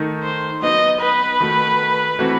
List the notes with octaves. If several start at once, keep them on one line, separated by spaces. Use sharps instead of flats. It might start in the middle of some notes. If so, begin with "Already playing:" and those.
Already playing: D#3 A3 D#4
C5
F#3 B3 D#4 D#5
B4
D#3 A3 D#4 F#4
E3 A3 C4 F#4